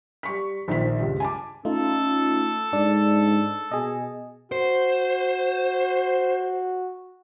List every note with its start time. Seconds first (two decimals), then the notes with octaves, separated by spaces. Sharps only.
0.23 G3 C#6 B6
0.68 A#1 D#3 C5 B6
1.00 C#2 G2
1.20 G#5 A5 D6
1.65 A3 C#4 D#4 F4 A4
2.73 G#2 D4
3.72 B2 G#4 D#5
4.52 F#4 C5